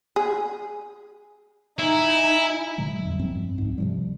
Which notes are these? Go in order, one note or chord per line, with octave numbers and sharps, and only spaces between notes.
G#4
D#4 E4 G#5
A#2 D3 F#3 G#3
F2 G3
G2 F3 G3 C4
C#2 G#2
C3 F3 G3